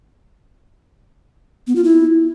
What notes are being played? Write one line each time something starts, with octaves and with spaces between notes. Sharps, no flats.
B3
F4
E4